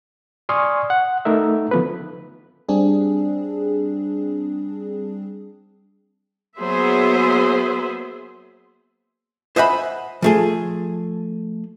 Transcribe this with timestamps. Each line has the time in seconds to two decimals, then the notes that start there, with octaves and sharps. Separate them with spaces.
0.49 D5 G#5 C6 C#6 D#6 F6
0.90 F#5
1.25 A3 D#4 A#4 E5
1.71 D3 F3 B3 A4 B4
2.69 G3 C4 D4 G#4
6.58 F#3 A#3 B3 G#4 C5 E5
9.56 C5 D#5 E5 F#5 G#5 B5
10.22 F3 A3 G#4